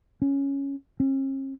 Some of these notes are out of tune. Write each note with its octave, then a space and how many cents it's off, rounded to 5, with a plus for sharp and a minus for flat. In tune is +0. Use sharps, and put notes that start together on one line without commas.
C#4 +0
C#4 -45